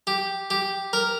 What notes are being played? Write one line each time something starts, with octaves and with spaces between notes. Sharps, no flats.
G4
G4
A#4